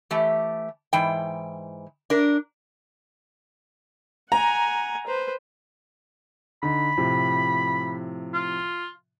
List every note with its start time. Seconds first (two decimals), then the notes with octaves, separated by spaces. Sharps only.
0.11 E3 A3 G4
0.93 G#2 E3 G5
2.10 D4 A#4
4.32 F#5 G#5 A#5
5.07 B4 C5
6.63 D3 D#4 B5
6.97 A2 C3 F3
8.34 F4